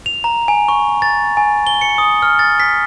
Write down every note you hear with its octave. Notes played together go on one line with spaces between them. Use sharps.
F7
A#5
G#5
C#6
A6
G#5
G7
C#7
D#6
F6
A6
B6